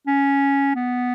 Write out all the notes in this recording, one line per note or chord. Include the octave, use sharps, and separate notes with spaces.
C#4
B3